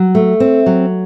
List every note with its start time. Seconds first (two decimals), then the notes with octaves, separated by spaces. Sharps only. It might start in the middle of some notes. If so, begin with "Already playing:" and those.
Already playing: F#3
0.15 A3
0.40 C4
0.66 F#3